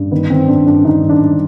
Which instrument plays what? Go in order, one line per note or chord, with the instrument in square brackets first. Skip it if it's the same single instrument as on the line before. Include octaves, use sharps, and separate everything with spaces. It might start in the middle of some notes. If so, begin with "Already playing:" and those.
Already playing: [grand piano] G2
D#3 B3
D#3 C4
G2 D4
G2 D4
D#3 D#4
D#3
D4
G2